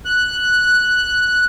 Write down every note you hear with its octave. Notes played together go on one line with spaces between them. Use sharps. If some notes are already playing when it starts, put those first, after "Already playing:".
F#6